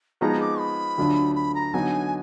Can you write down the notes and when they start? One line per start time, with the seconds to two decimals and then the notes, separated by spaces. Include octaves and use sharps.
0.21 F3 G#3 B3 D#4 G#4 A#5
0.40 D6
0.60 B5
0.97 D2 D3 F#3 D4 F4
1.36 B5
1.55 A#5
1.74 D3 F#3 B3 D#4 G#5